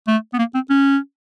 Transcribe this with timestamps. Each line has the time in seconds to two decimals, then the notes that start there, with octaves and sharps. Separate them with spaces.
0.07 A3
0.33 B3
0.38 A#3
0.54 C4
0.69 C#4